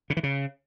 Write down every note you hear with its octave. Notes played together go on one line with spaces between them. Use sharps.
C#3
E3
C#3